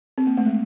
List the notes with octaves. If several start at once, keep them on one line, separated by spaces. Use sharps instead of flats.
C4
A#3
A3
G#3